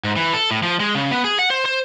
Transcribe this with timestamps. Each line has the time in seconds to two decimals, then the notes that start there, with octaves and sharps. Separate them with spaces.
0.04 G#2
0.16 E3
0.33 A4
0.51 A2
0.63 F3
0.80 G#3
0.95 C#3
1.11 B3
1.25 G#4
1.39 F#5
1.50 C5
1.65 C5